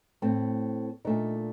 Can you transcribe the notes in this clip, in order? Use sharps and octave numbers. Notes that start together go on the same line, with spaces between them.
A2 A3 C4
A#2 A3 D4 D#4